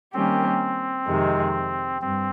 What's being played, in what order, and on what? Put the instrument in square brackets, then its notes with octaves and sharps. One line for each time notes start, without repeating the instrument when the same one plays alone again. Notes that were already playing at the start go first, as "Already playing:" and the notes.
[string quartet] D#3 G3 A#3 C#4 G4 [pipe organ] C4
[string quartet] F2 C3 D#3 G#3
[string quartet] G2 [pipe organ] C4